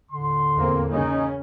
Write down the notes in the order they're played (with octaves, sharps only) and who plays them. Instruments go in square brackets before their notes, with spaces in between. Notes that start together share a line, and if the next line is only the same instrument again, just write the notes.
[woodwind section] D#2 A2 D3 [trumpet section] C6
[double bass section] E2 A#3 C4
[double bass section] C#3 C#4 [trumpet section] D#4